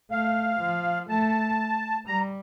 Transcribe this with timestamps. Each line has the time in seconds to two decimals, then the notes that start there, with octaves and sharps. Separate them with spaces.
0.11 A3 F5
0.60 F3
1.09 A3 A5
2.07 G3 A#5